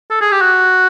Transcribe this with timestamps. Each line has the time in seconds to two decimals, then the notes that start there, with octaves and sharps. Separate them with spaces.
0.10 A4
0.21 G#4
0.32 G4
0.41 F#4